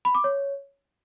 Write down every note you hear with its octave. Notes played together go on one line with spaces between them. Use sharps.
B5
D6
C#5